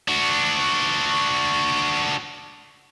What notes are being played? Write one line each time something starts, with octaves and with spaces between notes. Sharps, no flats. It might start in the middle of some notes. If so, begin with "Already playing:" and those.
D4 F#4